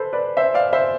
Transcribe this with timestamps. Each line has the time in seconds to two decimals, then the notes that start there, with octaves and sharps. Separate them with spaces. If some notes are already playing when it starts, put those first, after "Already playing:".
Already playing: A4 B4 C5
0.13 B4 D5
0.37 C5 E5
0.54 D5 F5
0.73 C5 E5